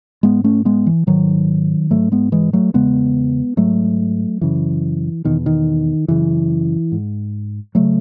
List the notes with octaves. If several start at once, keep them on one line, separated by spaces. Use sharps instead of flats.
G#2 G#3 B3
A3 C#4
G#3 B3
E3
G#2 D#3 F#3
G#2 F#3 A3
G#3 B3
E3 G#3
F#3 A3
E2 C#3 G#3 B3
G#2 F#3 A3
F#2 C#3 E3
E2 B2 D#3
D#3
F#2 C#3 E3
G#2
C#3 F#3 A3